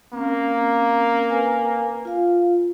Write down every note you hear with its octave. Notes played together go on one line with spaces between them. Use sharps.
A#3 C4 C#4
A#4 B4 G#5
F4 F5